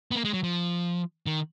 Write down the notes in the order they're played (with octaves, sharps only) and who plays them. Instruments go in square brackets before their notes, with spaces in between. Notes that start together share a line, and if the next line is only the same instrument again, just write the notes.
[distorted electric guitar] B3
A#3
G#3
F#3
F3
D#3